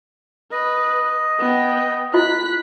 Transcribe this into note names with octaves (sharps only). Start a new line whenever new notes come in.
B4 D#5
B3 G5
E4 F4 D#5 F#6 B6